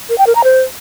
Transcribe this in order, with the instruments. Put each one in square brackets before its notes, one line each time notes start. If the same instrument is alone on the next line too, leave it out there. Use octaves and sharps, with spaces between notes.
[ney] A#4
G5
A#4
A#5
C5